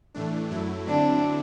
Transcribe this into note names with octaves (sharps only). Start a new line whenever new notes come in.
A2 E3 A3 D4
F#2 F#3 A3 E4
D3 F#3 C4 D4 E4